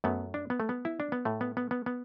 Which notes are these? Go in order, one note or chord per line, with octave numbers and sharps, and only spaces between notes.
F#2 F#3 A3 B3
D4
B3
A3
B3
E4
D4
B3
A2 A3
B3
B3
B3
B3